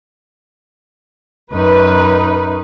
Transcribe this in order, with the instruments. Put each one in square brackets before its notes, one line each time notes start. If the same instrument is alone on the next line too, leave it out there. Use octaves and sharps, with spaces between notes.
[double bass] F#2 D#4 [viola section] B4